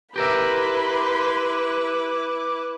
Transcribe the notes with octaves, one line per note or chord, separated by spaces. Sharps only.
E4 G4 A#4 B4 E5 B5 C6 D6